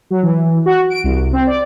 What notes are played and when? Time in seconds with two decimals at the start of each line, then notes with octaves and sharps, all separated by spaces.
0.11 F#3
0.23 E3
0.66 F#4
0.90 D7
1.04 C2
1.33 C4
1.47 D5